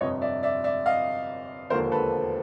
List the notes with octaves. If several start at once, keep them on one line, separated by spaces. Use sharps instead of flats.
G1 F2 C3 C#5 D#5
D5 E5
D5 E5
D5 E5
D#5 F5
E1 D#2 D3 F3 A#3 A#4 C5
A4 B4